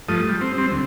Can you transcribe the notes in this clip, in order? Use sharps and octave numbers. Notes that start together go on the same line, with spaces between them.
G2 F3 A3 D#6
G3
C4
G3 C4
D2